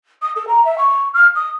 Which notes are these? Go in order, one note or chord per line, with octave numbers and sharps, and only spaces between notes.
D#6
A4
A#5
E5
C#6
F6
D#6